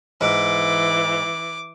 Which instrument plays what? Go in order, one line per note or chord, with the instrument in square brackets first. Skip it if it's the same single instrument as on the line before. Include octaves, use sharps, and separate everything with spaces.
[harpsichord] G#2 [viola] E3 [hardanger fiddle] D6